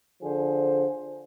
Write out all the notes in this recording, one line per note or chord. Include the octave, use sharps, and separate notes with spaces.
D3 F3 G#4 C5